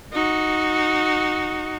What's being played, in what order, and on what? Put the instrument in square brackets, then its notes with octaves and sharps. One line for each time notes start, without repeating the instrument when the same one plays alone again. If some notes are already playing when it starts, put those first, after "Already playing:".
[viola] D#4 F#4